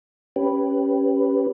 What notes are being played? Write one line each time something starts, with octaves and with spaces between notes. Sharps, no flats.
C#4 G4 B4